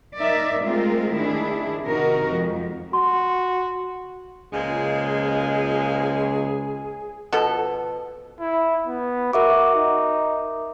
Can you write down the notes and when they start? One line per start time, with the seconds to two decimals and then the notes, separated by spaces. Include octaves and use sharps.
0.18 D#4 A#4 D5 E5
0.61 G#3 A3 C4 F4 A#4
1.14 D#3 D4 E4 G#4
1.86 C3 D#3 D#4 F#4 A#4
2.30 F2 G#3
2.93 F#4 C6
4.53 C#2 A#2 F3 G#3 G#4
7.33 B2 F3 A4
8.40 E4
8.87 B3
9.33 F#4 A#4 E5 D6
9.75 D#4